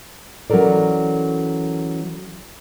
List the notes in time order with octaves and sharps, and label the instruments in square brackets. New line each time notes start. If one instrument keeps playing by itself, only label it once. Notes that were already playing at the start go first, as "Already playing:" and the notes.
[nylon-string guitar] E3 F#3 C#4 A4 A#4 D5